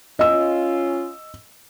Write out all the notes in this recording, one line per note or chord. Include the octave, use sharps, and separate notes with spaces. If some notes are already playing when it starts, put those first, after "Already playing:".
C#4 F4 D#5 E6